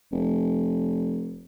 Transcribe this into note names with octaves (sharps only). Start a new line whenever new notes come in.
F1